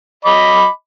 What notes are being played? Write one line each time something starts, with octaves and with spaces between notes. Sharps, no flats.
D#5 B5 D6